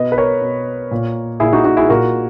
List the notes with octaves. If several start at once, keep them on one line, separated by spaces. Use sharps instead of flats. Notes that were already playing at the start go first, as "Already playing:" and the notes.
Already playing: B2 B4 D#5
B4
A#4 C#5
B2
A#2
A#2 E4 G#4
D#4 F#4
D#4 F#4
E4 G#4
A#2 F#4 A#4